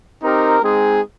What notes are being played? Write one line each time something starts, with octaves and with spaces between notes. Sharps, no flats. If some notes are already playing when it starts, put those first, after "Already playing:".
C4 D#4 G4 A#4
G#3 C4 D#4 G#4